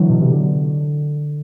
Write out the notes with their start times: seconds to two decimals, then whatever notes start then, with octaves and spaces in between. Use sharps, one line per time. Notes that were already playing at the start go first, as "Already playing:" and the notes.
Already playing: D3 E3 F#3
0.09 B2
0.21 C3
0.32 D3